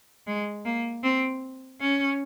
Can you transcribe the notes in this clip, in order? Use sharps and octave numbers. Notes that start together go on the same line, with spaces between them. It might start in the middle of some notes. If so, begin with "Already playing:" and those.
G#3
A#3
C4
C#4